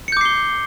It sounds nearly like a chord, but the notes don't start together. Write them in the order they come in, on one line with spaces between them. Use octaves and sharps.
C#7 G6 D6 C7 G7